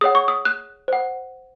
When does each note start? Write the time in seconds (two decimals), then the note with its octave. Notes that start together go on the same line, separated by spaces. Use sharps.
0.01 G#4 C#5 F#5 D#6
0.15 C#6
0.28 D#6
0.45 F#6
0.88 C5 F#5